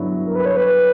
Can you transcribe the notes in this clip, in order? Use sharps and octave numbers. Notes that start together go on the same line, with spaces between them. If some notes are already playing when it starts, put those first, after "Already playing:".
Already playing: G2 D3 F#3 B3 E4
A#4
B4
C#5
B4